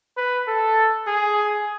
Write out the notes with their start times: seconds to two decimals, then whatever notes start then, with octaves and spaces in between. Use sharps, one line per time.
0.17 B4
0.47 A4
1.07 G#4